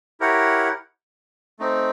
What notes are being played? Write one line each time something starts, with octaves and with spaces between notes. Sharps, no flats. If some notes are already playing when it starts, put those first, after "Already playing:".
E4 G4 A#4 C#5 F#5
A3 C4 D#4